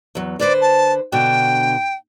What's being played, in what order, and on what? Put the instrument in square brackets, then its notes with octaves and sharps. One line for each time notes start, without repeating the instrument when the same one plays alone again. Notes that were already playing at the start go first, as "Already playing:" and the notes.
[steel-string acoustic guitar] E2 F#3
[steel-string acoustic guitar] D3 B4 C5 [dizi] D5
[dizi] A5
[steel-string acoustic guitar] B2 D3 F#4 [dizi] G5